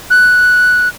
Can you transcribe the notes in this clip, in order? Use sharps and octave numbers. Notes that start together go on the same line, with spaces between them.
F#6